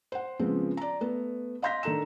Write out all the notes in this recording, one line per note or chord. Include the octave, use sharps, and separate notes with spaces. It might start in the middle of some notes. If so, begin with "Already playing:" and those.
C5 F#5
C#3 F3 G#3 B3 C4
D5 A#5
A3 B3
D#5 F5 C6 G6 A#6 B6
D#3 D4 A4 A#5 E7